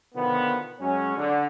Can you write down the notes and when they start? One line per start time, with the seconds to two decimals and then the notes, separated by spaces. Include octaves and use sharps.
0.13 B2 D3 D#3 F3 B3
0.78 F#2 F#3 G#3 C#4
1.16 D3